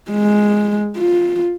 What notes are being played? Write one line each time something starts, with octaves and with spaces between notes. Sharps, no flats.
G#3
F4